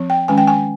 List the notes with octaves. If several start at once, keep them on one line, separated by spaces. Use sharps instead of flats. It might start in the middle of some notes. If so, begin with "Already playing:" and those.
Already playing: F3 C4
G5
D#3 G#3 C#4 G#5
G5
G#5